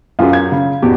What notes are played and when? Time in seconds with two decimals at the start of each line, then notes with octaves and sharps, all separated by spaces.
0.19 F#2 F4 G#4
0.33 G#6
0.52 C#3
0.82 E2 B2 G4